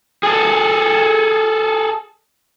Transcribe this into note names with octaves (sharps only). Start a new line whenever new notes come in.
G#4 A4